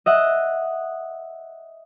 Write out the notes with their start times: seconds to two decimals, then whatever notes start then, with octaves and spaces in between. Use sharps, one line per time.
0.06 D#5 E5 F#5